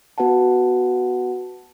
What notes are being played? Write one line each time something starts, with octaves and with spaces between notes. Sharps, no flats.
B3 F#4 B4 F#5 A5